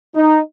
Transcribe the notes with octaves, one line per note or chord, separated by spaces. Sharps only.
D#4